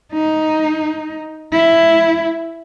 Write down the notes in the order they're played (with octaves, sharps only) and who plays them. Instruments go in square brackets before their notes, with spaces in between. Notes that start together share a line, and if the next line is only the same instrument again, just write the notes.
[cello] D#4
E4